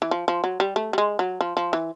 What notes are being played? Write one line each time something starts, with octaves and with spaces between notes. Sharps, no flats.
E3
F3
F3
F#3
G3
A3
G3
G#3
F#3
F3
F3
E3